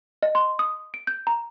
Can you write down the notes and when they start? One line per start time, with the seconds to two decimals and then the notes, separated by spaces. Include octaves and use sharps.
0.23 D#5
0.35 C6
0.59 D#6
0.94 D7
1.07 G6
1.27 A#5